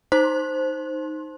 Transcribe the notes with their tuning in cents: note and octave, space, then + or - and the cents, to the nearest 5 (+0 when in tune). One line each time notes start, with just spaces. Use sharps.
D#4 +0 C5 +0 C6 +25